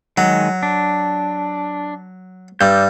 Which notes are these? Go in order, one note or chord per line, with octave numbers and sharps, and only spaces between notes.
D#3 F#3 G#3
D4
G2 D5 E6 G6